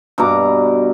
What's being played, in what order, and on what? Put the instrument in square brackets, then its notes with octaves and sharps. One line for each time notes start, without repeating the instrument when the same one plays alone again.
[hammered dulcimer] G2 B2 A#5 D6